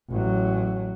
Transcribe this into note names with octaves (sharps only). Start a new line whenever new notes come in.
A1 F#3